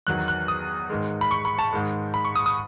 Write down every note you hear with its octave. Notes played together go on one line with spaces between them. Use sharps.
E2 D#3 F#3 F#6
F#6
D#6
G#2 D#3 G#3
B5
C#6
B5
A5
G#2 D#3 G#3
B5
C#6
D#6
D#6